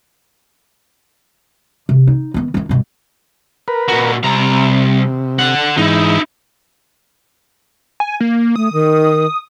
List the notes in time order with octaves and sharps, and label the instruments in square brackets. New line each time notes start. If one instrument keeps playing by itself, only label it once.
[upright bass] C3
D#4
D#3 B3
D#3 E4
G2 B2
[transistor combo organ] A#4 B4
[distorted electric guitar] A#2 F#4
[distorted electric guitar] C2 A#5 [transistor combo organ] C3
[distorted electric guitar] D3 F#5
[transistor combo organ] G#2 E3 [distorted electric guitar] D#4 E4
[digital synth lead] G#5
A#3
[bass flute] A3 [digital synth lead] D#6
[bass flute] D#3